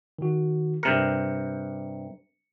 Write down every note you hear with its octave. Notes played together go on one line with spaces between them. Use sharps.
D#3 F#4
G2 C3 A#4 C#7